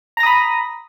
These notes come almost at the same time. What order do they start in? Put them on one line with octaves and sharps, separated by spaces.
A#5 A#6 D#6 B5